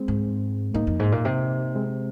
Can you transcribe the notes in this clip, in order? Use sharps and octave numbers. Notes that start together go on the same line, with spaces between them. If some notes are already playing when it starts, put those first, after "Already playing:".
Already playing: G#3 C4
G#2
G#2 A#3 D#4
F2
G#2
A#2
C3
G#3 C4